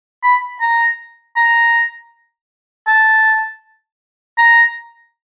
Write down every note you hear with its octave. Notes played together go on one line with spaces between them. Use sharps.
B5
A#5
A#5
A5
A#5